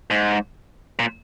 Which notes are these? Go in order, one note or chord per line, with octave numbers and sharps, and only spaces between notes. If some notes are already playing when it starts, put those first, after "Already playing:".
G#2
A#2